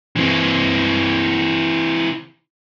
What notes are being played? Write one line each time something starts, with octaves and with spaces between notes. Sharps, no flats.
E3 C4